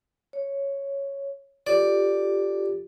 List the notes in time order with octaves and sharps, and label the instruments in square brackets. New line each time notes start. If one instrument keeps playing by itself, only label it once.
[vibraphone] C#5
[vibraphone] F4 G4 A4 [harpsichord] D5